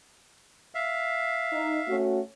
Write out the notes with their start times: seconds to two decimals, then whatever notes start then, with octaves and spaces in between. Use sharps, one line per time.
0.75 E5 F5
1.53 D#4
1.88 A3 C#4 F#4